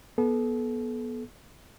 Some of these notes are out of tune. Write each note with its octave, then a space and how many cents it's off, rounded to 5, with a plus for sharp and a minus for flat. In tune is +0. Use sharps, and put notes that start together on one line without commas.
B3 -20 A4 -35